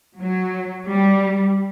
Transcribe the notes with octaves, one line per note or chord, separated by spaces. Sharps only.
F#3
G3